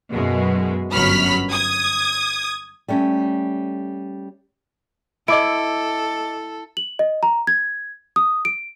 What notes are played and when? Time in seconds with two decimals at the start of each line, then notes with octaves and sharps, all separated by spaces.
0.12 F#2 B2 G#3
0.93 G1 F#2 F#3 B5 F6 B6
1.51 D#6 G#6
2.88 G3 A3 C#4
5.28 E4 A4 D#5 D6 D7
6.77 F#7
6.99 D#5
7.23 A#5
7.47 G#6
8.16 D#6
8.45 D7